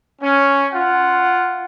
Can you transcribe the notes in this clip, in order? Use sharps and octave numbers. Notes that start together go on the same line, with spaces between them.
C#4
F4 F#5